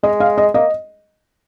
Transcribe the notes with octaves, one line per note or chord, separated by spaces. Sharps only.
G#3 D#5
F5
D#5
A#3 D#5